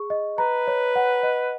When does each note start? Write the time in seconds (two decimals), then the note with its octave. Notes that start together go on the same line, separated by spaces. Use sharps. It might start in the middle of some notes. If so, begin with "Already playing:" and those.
Already playing: G#4 C#6
0.10 D#5
0.38 B4 A#5
0.67 C#5
0.96 F#5
1.23 D#5